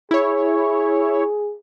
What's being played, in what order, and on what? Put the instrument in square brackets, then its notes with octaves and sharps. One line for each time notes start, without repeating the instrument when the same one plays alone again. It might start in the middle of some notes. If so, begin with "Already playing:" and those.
[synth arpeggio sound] E4 C#5 [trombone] G#4